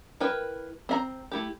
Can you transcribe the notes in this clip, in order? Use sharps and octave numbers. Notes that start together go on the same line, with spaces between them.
E4 A#4 B4 G5
C4 E5 A#5
A3 E4 G4